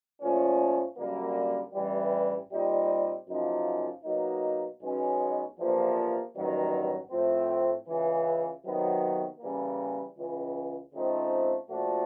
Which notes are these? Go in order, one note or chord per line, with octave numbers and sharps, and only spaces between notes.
A#2 F3 A3 C#4
F#2 D3 G3 A#3
A1 G2 E3 G3
A#2 G3 C4 D#4 G4
F#2 C#3 F3 A#3 D#4
B2 F#3 A#3 D#4
B1 B2 G#3 C#4
E2 C3 F3 A#3 D4
A1 G2 D#3 F#3
A2 F3 A3 C4
C#2 C#3 E3
C3 D#3 F#3 B3
C#3 E3 G3 A#3
C#2 C#3 E3
C#3 F3 A3 C4 D#4
A#2 F3 A3 D4 F#4